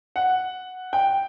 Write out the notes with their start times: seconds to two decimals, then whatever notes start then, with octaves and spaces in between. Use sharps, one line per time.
0.16 F#5
0.93 G5